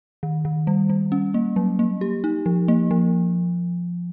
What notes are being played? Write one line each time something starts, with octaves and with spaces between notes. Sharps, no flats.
D#3
D#3
G3
G3
C#4
A#3
F#3
A#3
G4
D#4
F3
A#3
F3